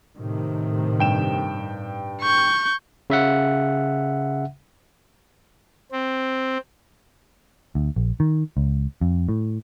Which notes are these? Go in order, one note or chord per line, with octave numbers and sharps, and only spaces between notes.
A2 C3 D#3
G2 G5 E7
C#6 G6
C#3 E5 F#5
C4
D2
A#1
D#3
C#2
F2
A2